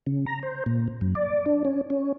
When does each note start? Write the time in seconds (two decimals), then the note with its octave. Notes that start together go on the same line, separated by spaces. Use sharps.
0.06 C#3
0.26 A#5
0.43 C5
0.66 A#2
1.01 F#2
1.15 D5
1.46 D4
1.65 C#4
1.90 C#4